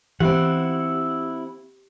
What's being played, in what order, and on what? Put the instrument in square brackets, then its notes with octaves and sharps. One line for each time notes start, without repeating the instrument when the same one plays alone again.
[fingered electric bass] E3 [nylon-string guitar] C4 F4 E5 [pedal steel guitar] E4 F#5 [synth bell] G4